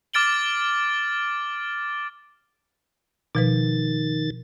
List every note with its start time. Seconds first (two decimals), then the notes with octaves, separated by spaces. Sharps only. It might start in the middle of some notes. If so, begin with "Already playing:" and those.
0.14 D6 F6 A6 D7 F#7 G7
3.35 B2 D#3 F3 B4 A6